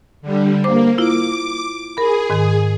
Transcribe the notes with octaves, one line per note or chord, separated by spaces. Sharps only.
D3 G3
A#3 C5 D6
E4 F4 D6
G#4 A#4 B5
G#2 D#3